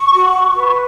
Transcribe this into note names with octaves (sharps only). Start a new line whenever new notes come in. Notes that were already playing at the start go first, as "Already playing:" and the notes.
Already playing: C#6
F#4
B4